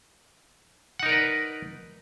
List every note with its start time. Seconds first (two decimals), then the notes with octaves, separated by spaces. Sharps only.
0.99 F#5
1.03 D#4
1.06 A#4
1.09 D5
1.12 B4